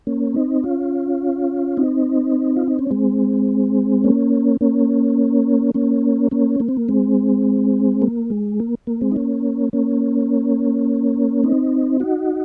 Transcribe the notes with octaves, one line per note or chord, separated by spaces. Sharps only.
A#3 C#4
C4 D#4
C#4 F4
C4 D#4
F4
D#4
C#4
G#3 C4
A#3 C#4
A#3 C#4
A#3 C#4
A#3 C#4
A#3
C4
A#3
G#3 C4
A#3
G#3
A#3
A#3
G#3 C4
D#4
A#3 C#4
A#3 C#4
C4 D#4
D#4 F#4